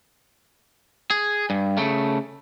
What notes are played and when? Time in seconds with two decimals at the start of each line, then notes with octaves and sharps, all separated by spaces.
1.10 G#4
1.50 G2
1.77 C#3 A3